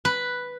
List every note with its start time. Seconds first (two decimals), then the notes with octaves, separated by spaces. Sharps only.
0.05 B4